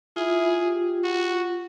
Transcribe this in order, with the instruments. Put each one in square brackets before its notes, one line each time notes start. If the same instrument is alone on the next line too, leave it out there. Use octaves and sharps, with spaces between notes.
[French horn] E4 [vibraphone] F4 [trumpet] G#4
[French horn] G4
[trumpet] F#4